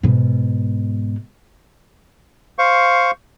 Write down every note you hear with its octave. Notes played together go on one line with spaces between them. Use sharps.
G#2 B2
C5 F5 C#6